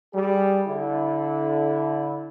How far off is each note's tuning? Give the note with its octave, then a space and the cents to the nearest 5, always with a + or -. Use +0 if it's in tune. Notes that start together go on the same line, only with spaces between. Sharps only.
G3 +0 G#4 +0
D3 -25 E4 -15